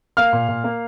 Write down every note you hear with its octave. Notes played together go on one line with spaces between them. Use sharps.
A#3 F5 F6
A#2
A#2
A#3